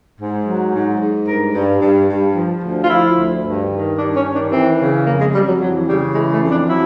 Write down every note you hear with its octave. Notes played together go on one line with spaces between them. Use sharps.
G#2
F#3
G#2
G#2
G2 A#4
G2
G2
G2
F3
D2
F4
F3 E4
D2
G2
D#3
G2 D4
C#4
D#3
D4
E3 C4
C#3
F2 A#3
G#3
F2 G3
F#3
E3 F#3
C#3 G3
E3 G#3
A3
F2
D4
F#3 E4